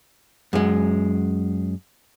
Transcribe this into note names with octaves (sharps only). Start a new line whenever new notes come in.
F#2 G#3